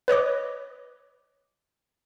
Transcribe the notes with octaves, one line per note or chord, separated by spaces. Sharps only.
B4 C#5 D#5 D6